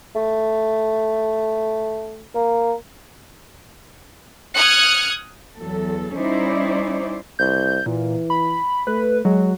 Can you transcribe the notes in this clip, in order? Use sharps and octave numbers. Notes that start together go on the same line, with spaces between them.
A3
A#3
D#6 F6 F#6 G#6 C#7
E2 F#3 A4
G3 C#4 D#4 E4 C5 D5
C2 G6
A#2 E3
B5
A3 B4
F#3 G#3